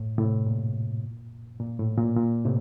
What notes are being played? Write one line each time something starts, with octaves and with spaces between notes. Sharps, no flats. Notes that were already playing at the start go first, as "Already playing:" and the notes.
Already playing: A2
A2 C3
A#2
A#2
A2
A#2
A#2
A2 C3